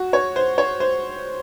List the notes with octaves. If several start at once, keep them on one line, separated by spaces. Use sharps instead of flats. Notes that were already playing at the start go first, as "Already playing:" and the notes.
Already playing: F#4
C#5
C5
C#5
C5